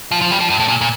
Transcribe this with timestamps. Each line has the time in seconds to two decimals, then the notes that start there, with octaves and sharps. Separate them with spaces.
0.11 F3
0.22 F3
0.31 G3
0.41 F3
0.50 G2
0.60 A2
0.68 A#2
0.81 A#2